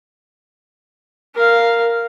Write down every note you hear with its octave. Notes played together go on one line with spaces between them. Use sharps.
A#4 F5